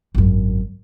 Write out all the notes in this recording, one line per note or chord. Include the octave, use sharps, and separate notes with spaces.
G#1 F#2